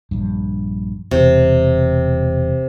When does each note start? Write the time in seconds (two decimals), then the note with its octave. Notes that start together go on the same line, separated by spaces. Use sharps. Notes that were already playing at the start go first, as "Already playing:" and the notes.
0.11 A#1 G2
1.11 E1 C3